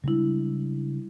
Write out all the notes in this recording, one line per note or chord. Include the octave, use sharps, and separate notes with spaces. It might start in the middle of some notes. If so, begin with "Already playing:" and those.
C#3 G3 G#3 D4 E4